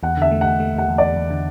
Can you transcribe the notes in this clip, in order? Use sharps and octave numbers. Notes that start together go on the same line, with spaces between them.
E2 F#5
D3 E5
A3
E2 F#5
A3
E2 F#5
E2
E2 D5
E2
D3